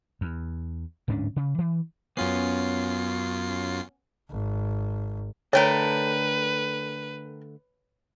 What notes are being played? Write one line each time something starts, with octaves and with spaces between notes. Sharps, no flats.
E2
D1 G#2 C#4 D4
C#3
E3
F#2 B3 C#4 F4 C7
G#1
D3 A3 A#4 B4 C#5 G5 A5